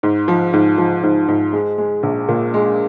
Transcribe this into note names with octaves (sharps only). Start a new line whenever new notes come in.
G#2
F3
G#2
F3
G#2
G#2
G#3
G#3
A#1
A#2
G#3